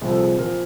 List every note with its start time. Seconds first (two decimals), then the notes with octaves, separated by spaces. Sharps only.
0.01 C2 A#2 F3
0.11 A4
0.20 G#4
0.38 A#2 F3 A#4